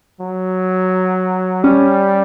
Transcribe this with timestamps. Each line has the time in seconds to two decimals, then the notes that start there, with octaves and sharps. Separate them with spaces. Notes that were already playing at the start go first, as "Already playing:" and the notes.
0.21 F#3
1.64 G3 C#4